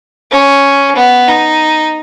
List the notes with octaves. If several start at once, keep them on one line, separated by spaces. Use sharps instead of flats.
C#4
B3
D#4